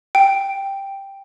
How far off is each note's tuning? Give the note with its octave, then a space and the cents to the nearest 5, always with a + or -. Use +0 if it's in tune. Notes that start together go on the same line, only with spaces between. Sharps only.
G5 +5